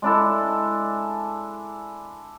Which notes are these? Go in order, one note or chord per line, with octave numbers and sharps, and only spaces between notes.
G#3 D4 E4 A4